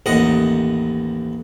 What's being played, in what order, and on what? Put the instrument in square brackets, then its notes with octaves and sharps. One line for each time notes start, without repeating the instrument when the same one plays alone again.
[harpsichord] A1 D#2 D#5 F#5